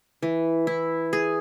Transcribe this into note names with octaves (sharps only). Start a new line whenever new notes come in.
E3
E4
G#4